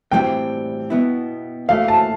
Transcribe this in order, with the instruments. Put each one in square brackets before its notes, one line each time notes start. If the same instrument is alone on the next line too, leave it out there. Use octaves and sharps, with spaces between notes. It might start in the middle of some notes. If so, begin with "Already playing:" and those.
[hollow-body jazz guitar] A2 E3 G3 C4 [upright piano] G5
[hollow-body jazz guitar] B2 B3 E4
[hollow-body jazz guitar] E3 A3 E4 [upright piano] F5
[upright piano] A5